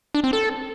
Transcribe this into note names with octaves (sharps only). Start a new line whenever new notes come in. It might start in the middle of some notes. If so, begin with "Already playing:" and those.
D4
C4
A4